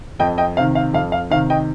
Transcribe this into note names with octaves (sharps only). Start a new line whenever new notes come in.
F2 D#5 G5
D#5 G5
C3 D#3 F5
F5
F2 F5
F5
C3 D#3 F5
D#5 G5